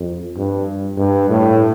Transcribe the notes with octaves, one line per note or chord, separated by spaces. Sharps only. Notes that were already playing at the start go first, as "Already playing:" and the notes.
Already playing: F2
G2
G2
A2